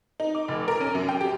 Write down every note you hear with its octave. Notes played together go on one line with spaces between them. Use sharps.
D#4
D6
F1
A#4
C#4
F#2
G5
G4